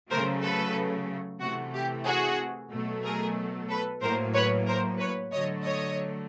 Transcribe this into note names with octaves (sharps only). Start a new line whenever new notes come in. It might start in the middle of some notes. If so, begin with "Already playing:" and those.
C#3 F#3 A3 A#4 C5
A4 B4
C3 E3 A3 F#4
G4
F#4 G#4
B2 F#3 A3
G#4 A#4
A4 B4
A2 F#3 A#3 A#4 C5
B4 C#5
A#4 C5
B4 C#5
D3 F#3 A3 C#5 D#5
C#5 D#5